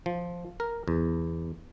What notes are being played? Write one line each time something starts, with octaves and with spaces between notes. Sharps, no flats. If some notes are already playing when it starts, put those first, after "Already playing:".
F3
A#4
E2